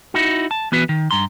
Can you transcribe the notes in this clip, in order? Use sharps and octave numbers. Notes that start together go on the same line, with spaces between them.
D#4 E4 F#4
A5
E3 B3 F#4 B4
D#3
G2 A#5 C6